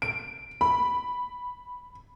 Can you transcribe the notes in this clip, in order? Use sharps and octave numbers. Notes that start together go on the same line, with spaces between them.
D7
B5